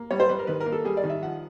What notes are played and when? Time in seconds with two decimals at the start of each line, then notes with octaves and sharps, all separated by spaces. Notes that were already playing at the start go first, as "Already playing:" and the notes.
Already playing: A#3
0.11 G3 C#5
0.20 C5
0.29 G3 B4
0.39 A#4
0.47 D#3 B4
0.60 A#4
0.66 A#3
0.72 A4
0.85 G3 G#4
0.97 D5
1.04 D#3
1.10 E5
1.22 F3 F#5